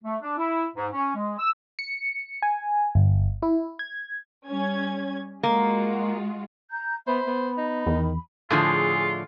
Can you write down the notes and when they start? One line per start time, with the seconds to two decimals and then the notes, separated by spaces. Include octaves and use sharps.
0.04 A3
0.22 D4
0.38 E4
0.76 G#2
0.93 C#4
1.15 G#3
1.38 E6
1.79 C#7
2.42 G#5
2.95 G1
3.42 E4
3.79 G#6
4.49 G3 C#4 G#6
5.43 G#3 A#3 F4 F#4
6.71 A#5 G6
7.07 B3 C5 E5 B5
7.27 B3 B5
7.57 D#4
7.86 E2 D#3
8.50 A2 D3 F3 F4 G#4